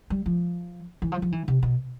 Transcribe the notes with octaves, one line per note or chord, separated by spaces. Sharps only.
G3
F3
E3
F3
F3
E3
C3
B2